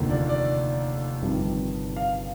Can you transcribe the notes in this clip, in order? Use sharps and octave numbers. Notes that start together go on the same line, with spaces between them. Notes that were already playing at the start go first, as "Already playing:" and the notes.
Already playing: F1 D#2 D3 F3 A#3
D5
D5
G1 F2 C3 D#3 G3
F5